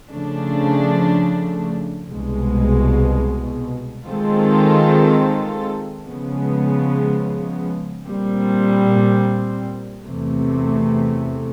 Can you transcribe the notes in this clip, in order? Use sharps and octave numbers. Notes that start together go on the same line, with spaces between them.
C#3 F3 A3 D4
C2 B2 G#3
D#3 G#3 C4 F4 A4
C#3 F3 G#3 B3
A#2 G3 C4
E2 C3 E3 A3